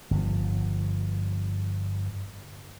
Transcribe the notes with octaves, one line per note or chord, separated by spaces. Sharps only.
G1 F3